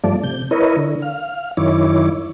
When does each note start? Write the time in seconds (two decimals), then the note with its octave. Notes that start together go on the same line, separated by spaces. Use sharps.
0.04 G2 F3 A3 D5
0.24 C3 G6
0.51 E4 A#4 B4 C#5 D#5
0.77 D3
1.02 F5
1.57 F#2 D#3 E4 C#5 D6